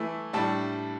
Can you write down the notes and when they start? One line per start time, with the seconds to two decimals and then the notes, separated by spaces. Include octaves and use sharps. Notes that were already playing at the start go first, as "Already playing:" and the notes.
Already playing: E3 A3 E4
0.33 A2 G3 D4 A5